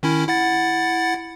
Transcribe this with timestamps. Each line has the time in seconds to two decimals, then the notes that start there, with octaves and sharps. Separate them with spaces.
0.03 D#3 C#4 E4
0.28 E4 F#5 A6